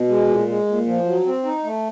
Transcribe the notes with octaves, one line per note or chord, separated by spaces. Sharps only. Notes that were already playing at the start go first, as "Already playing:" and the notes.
Already playing: B2
G#3
A#2
G#3
A#2
F3
F#3
C4
D#4
A3